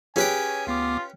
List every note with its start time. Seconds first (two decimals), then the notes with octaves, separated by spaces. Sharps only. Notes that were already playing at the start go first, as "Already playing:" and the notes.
0.16 C#4 G4 G#4 B4 C#5 G5 G#5
0.67 D2 B3 F4 D6